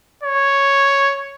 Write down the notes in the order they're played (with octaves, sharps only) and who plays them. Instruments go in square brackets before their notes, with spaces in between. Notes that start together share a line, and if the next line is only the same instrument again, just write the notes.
[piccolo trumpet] C#5